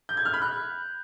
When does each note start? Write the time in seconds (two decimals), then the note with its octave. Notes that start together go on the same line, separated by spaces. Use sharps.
0.09 G6
0.17 G#6
0.25 F6
0.34 B5
0.42 F#6